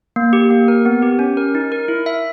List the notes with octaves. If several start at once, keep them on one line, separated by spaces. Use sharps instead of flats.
A#3
G4
A#3
A#4
B3
G4
C#4
A#4
D#4
A#4
E4
E5